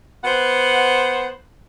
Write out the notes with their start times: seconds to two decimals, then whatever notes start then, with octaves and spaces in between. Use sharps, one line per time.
0.24 B3 C5 F#5